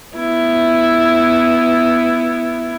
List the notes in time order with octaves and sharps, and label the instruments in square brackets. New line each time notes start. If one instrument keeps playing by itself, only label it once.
[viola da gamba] B3 E4